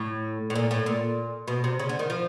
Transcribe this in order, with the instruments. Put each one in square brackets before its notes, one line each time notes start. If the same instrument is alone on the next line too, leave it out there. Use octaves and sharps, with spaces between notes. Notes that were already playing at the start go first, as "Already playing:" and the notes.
Already playing: [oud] A2
A2
A#2
A2
A#2
B2
C3
C#3
D3
D#3
F3